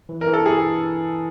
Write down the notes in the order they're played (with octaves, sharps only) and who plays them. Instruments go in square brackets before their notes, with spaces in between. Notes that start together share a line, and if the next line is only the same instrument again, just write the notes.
[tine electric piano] E3
[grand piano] A#4
[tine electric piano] E3
[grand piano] A4
[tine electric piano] E3 [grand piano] G#4